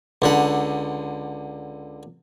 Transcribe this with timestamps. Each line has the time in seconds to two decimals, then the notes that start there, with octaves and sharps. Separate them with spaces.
0.22 C#2 D3 F#5